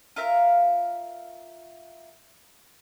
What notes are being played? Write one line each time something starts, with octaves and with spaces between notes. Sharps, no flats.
F4 A#4 E5 F5